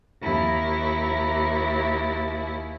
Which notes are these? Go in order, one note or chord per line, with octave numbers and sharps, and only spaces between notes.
D#2 E4